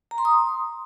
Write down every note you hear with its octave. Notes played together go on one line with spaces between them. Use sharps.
A#5
C6
D#6